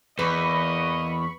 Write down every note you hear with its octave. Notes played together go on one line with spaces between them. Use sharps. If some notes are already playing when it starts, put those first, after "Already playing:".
E2 A#3 B4 D#5 B5 C#6